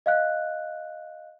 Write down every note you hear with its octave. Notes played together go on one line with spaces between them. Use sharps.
D#5 F5 F#6